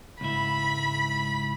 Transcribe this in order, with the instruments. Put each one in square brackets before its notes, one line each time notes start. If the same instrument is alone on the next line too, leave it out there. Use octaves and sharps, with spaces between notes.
[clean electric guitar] C#2 G#2 E4 [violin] B5